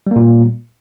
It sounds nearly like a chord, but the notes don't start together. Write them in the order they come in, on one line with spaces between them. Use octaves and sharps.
G3 A#3 A#2